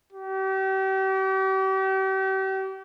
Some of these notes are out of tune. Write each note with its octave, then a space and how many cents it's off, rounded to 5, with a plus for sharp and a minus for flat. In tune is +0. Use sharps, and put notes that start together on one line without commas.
G4 -40